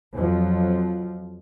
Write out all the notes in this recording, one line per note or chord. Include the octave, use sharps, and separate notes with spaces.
F2 F3 F#3